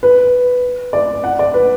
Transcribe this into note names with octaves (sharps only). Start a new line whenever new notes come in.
B4
D5
F#5
D5
B4